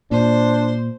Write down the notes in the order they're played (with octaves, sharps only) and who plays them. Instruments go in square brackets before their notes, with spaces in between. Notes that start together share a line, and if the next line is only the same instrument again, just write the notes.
[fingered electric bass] A#2 [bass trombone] D4 [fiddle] C5